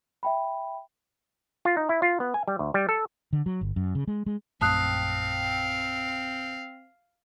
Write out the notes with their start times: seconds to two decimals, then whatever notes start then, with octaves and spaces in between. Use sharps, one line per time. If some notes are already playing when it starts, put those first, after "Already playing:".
0.23 E5 G5 B5
1.65 F4
1.77 D#4
1.89 E4
2.02 F4
2.20 B3
2.34 G#5
2.48 G3
2.59 D2
2.74 G3
2.89 A4
3.33 D3
3.46 F#3
3.61 G1
3.76 F#2
3.95 C#3
4.08 G#3
4.26 G#3
4.61 A#1 F#2 A3 C4 F5 A5 D#6 F#6